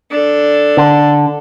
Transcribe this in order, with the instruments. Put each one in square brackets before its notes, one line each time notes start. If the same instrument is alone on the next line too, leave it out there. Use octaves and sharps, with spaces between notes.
[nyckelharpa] D4 A4
[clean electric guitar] D3